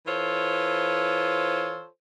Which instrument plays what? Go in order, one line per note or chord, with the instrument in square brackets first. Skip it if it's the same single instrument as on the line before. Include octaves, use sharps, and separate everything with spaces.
[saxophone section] E3 F4 A4 C5 C#5